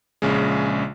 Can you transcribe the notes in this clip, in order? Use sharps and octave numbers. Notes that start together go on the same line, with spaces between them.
A#1 C#3 G#3